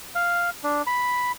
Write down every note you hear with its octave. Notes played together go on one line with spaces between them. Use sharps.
F5
D4
B5